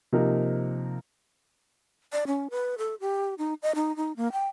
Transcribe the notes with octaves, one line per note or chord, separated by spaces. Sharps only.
C3 F3 A#3 D#4 A#4
D5
C#4
B4
A4
G4
D#4
D#5
D#4
D#4
A#3
G5